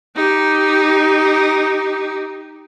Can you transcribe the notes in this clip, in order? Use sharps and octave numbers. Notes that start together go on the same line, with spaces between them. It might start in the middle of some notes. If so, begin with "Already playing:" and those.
D#4 G4